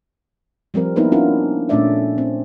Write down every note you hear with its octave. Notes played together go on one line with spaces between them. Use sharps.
F3 G3 C4 A#4
A#3 B3 D#4 E4 A#4 B4
C#4 D4 E4 F4 A#4
A#2 A3 C#4 D4 D5 E5
C4